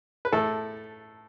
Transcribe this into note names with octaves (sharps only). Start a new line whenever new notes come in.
B4
A2 E4 A4